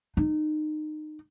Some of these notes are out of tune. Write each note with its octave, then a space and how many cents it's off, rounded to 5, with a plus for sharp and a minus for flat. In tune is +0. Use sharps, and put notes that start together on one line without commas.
D#4 -25